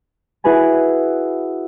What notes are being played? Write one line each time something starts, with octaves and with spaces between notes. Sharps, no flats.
E4 F#4 G#4 B4 G#5